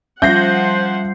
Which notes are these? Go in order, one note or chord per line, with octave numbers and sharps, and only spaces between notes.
F3 G3 C5 F#5 G6 A#6 C7